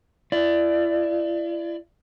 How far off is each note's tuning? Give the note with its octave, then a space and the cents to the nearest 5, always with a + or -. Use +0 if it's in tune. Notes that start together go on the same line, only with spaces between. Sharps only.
E4 +40 D5 +10